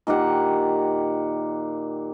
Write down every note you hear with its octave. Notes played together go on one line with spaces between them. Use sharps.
A#2 D#3 G4 F#5